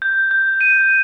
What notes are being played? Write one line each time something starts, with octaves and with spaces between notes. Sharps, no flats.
G6
G6
D#7